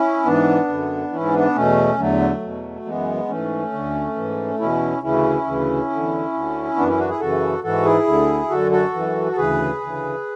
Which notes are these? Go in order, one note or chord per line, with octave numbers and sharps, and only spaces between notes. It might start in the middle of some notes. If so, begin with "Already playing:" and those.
Already playing: C#4 E4
G#2 E3 B3 D4
F#2 D3
G#2 E3 C#4 E4
B3 D4
E2 B2 A3 C#4
E2 D3 F#3 A3
E2 B2
F#2 E3 G#3 B3
G#2 E3 A3 C#4
D2 D3
G#2 E3
E2 B2 C#4 E4
D2 C#3 E3 C#4 E4
D2 C#3 E3
E2 D3
D2 D3
F#2 E3 B3 D4
C#4 E4
D4 F#4
E4 G#4
F#2 C#3 E3 F#4 A4
G#2 E3 F#4 A4
E4 G#4
D2 D3
F#2 D3 F#4 A4
F#4 A4
F#2 E3
A4
D2 C#3 E3 G#4 B4
D2 C#3 E3